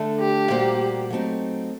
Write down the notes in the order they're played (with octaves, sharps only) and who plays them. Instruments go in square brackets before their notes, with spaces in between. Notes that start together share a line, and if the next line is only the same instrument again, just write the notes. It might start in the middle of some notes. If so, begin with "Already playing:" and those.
Already playing: [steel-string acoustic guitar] D3 A3 D4
[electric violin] G4
[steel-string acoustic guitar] A#2 G3 A#3 F#4 C5
F#3 A3 C4 D#4